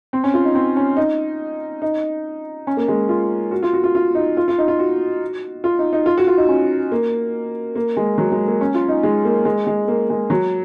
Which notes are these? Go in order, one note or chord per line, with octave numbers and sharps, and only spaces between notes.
C4
C#4
F4
D#4
C4
C#4
D#4
D#4
C#4
A#3
G#3
F4
F#4
F4
F#4
F4
F4
D#4
F4
F4
D#4
F4
F#4
F4
D#4
D#4
F4
F#4
F4
D#4
C#4
A#3
A#3
G#3
F#3
G#3
A#3
C#4
F4
D#4
G#3
A#3
G#3
G#3
A#3
G#3
F#3